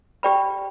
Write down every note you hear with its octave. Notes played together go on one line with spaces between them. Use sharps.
G4 D5 G5 B5